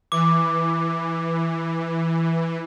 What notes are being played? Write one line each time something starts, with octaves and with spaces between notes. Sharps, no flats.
E3 D6